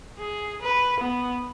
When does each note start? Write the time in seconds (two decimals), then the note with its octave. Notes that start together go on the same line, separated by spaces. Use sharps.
0.18 G#4
0.62 B4
1.00 B3